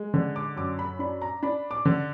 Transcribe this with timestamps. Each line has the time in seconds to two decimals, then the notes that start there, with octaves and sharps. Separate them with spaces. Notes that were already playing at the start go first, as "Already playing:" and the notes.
Already playing: G#3
0.14 D3
0.36 D6
0.56 F#2 D6
0.79 B5
0.99 D4 B5
1.22 A#5
1.43 D4 B5
1.71 D6
1.85 D3